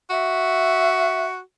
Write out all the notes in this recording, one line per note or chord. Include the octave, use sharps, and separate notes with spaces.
F#4 E5